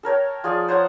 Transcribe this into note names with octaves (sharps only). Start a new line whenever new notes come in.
A4 A#4 C#5 G5
F3 G#4 D5
C5 C#5 F#5 A#5